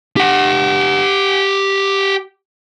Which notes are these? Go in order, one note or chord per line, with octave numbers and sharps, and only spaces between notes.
G4 F#5